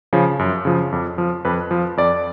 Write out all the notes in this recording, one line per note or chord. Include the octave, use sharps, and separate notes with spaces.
C#3 F3
F#2
C#3 F3
F2
F3
F2 B4
F3
F2 D5